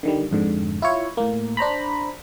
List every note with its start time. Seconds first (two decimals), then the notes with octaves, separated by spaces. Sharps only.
0.03 D3 D#3 G3
0.31 F2 G#2 D3
0.82 E4 F4 C#5
1.17 A2 A#3
1.57 D4 C5 A#5 B5